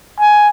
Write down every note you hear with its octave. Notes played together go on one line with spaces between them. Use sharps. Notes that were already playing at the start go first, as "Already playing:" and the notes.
G#5